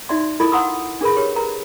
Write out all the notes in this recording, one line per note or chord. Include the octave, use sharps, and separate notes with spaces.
D#4 F#4 D5 E5 C6
E4 F4 A4 A#4 D#5 B5
F5 F#5 A#5 C6 D#6 E6
D4 G#4 A#4 B4 B5
G4 A#4 B4 C#5
A#4 B4 A#5